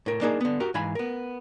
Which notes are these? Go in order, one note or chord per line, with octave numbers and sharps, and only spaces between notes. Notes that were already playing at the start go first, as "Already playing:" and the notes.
A2 A#4
A#3 D4 D#4 G#4 A#4
D3 B3
F#4 G4 A#4
G#2 E3 F5 G#5 B5
B3 A#4